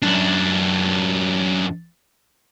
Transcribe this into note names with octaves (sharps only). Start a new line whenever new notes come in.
F#2 D4